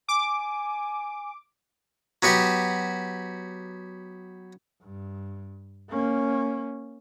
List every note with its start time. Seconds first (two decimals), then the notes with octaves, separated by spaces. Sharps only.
0.09 G#5 D6
2.23 F#3 B3 F#4 G4
4.82 G2
5.90 A#3 C#4